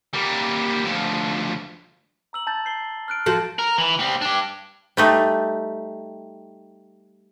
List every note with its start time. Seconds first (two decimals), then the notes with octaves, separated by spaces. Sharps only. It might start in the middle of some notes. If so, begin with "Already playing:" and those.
0.13 G3 A#3
0.84 D2 F3
2.33 A#5 E6 F#7
2.47 A5 G6 A6
2.65 G6 C7 G7
3.08 F6 F#6 D7
3.26 F3 F#4 A4
3.59 A#4
3.78 E3
3.99 G3 C4
4.21 D4 G4
4.97 G3 A3 D#4